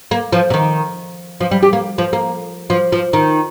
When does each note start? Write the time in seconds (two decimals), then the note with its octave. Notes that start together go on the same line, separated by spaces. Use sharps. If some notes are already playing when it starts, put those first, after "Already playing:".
0.11 A#3
0.32 F3
0.50 C3
0.54 D#3
1.41 F3
1.51 G3
1.63 G4
1.73 A#3
1.98 F3
2.13 A#3
2.70 F3
2.92 F3
3.13 D#3